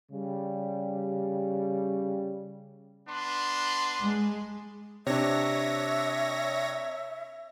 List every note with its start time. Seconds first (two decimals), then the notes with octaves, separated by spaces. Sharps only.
0.12 C#3 G3
3.09 B3 D4 C6
4.01 G#3
5.07 C3 D4 C#5 E5 A#6